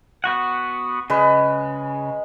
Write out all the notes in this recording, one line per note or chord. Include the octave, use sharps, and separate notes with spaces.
B3 F#4 F#5
C#3 G#3 B4 D#5